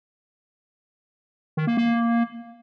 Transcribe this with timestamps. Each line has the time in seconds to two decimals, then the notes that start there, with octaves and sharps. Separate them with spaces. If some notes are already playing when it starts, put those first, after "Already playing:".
1.57 D#3
1.67 A#3
1.77 A#3